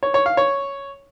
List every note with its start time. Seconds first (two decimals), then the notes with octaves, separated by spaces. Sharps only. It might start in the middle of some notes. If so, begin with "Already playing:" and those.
0.03 C#5
0.14 C#5
0.26 F5
0.37 C#5